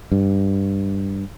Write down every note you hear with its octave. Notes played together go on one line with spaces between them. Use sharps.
G2